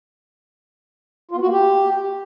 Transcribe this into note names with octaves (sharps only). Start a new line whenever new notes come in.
F4
B3
F#4
A#3
G4